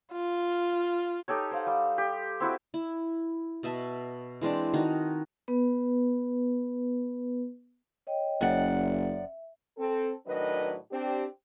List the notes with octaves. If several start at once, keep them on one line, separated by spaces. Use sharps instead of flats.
F4
D#4 G4 A4 C#5
C5 F5 F#5
G3
G4
C4 E4 F#4 G4
E4
B2 D#5 E5 A5
E3 G#3 C4 D4
D#3 D#4 F#4
B3 B4
C#5 D#5 G5
F#1 F#2 D5 F#5
E5
C4 A4
A2 D#3 F#3 D4 B4 D#5
C4 D4 G4